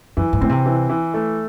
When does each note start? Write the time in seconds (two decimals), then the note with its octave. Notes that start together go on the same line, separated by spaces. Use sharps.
0.17 F#2 E3
0.33 G#2
0.41 A2 C4
0.50 C3
0.66 E3
0.89 E3
1.14 A3